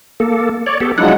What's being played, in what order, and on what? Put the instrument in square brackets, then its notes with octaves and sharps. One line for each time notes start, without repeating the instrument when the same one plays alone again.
[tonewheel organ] A#3 A4
C#5 D5
B3 G4 A4
[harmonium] F3 F#3 G#3 [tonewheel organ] D4 E4 F#5